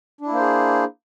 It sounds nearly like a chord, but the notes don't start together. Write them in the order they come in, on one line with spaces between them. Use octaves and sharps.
D4 E4 A#3 C5 G#4